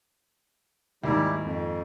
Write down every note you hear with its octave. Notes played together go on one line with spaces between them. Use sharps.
D#2 G#2 G3 E4 G4
F2